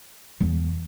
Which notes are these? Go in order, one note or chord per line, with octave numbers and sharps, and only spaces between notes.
E2